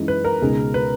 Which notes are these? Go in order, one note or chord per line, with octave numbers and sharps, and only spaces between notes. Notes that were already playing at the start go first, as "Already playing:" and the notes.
Already playing: F#2 E3 G#3 D#4
B4
A#4
C#2 B2 G#3 D#4 G#4
B4